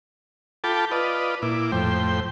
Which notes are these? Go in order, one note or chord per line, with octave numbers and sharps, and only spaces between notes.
F4 A4 G5 A5 B5 D6
F4 B4 D5 D#5
A#2 E4 D6
F2 A2 C5 G5